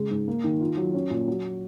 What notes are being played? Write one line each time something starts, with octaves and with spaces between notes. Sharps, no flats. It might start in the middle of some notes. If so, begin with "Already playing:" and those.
Already playing: C#3 G#3
G#2
A#3
D#3
F4
F#3
C#4
A#2
F#3